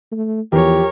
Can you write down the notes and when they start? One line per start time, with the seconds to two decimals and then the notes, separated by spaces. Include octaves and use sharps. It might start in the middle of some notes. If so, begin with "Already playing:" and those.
0.12 A3
0.52 E2 F3 G4 A#4 C#5